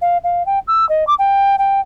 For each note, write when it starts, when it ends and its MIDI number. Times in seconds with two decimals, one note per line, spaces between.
0.01 0.17 77
0.24 0.45 77
0.46 0.59 79
0.67 0.87 88
0.89 1.04 75
1.07 1.14 86
1.18 1.56 79
1.58 1.80 79